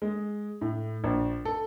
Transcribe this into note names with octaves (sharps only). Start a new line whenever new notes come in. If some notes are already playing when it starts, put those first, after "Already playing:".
G#3
A2
A#1
A4